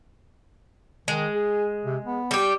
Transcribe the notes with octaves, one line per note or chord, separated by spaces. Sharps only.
D#3 G#3
G#4
C3
B3
G3 G4